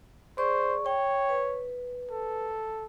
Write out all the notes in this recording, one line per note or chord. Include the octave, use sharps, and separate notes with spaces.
G#4 C5 D5 C#6
C#5 G5
B4
A4